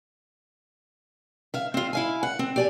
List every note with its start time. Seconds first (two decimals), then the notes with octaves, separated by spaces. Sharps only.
1.54 E5 F5
1.74 C4 F4
1.93 E4 F5 G#5
2.23 F#5
2.39 C4
2.56 G4 D5 G#5